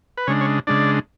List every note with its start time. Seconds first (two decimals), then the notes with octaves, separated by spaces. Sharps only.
0.17 B4
0.27 C#3 G#3 D4 C#5
0.41 C#5
0.67 C#3 G#3 D4 D5